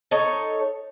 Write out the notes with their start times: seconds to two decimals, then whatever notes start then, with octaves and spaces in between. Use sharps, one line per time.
0.11 D#4 A4 C#5